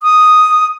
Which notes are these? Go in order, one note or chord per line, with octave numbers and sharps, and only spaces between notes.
D#6